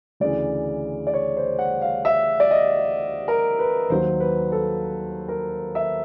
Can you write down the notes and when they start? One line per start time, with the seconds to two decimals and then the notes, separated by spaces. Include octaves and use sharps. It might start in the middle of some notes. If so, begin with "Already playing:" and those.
0.20 D2 C#3 E3 D5
1.07 D5
1.14 C#5
1.37 C5
1.59 F#5
1.82 F5
2.05 E5
2.40 D5
2.51 D#5
3.28 A#4
3.59 B4
3.90 D#2 D#3 F#3 C5
4.20 B4
4.52 A4
5.28 A#4
5.75 E5